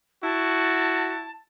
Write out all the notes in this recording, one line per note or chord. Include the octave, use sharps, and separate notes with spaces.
E4 F#4 A5